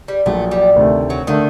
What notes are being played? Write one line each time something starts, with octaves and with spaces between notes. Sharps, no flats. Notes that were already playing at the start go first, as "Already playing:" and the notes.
G3
A#1 A#2 F#3 A3
G3
D2 C3 D#3 A3
F#3
D3 D#3 A3 D4